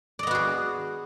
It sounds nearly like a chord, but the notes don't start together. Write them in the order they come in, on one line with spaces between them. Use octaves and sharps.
D5 D#5 B3 F#4 G#4